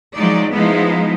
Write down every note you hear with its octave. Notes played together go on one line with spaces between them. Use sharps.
F3 F#3 G#3 D#4 D5
F3 G#3 B3 D#4 E4